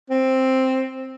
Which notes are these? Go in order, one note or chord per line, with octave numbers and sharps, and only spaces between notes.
C4